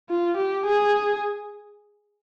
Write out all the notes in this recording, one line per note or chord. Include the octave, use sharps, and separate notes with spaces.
F4
G4
G#4